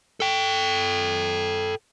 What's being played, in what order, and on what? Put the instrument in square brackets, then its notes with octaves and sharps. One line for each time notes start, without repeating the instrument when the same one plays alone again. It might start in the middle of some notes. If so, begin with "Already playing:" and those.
[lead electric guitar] A4 G5